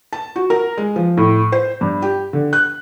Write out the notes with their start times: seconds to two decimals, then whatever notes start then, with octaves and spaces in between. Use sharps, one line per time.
0.13 A5
0.36 F#4
0.50 A#4
0.78 G#3
0.96 F3
1.17 A2
1.52 C5
1.81 G2
2.02 G4
2.33 D3
2.53 F#6